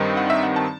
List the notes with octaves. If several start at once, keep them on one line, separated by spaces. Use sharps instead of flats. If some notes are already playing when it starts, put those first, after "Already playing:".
Already playing: G2 D#3 G3 C4 D#4
F#5
E5
F#5
A5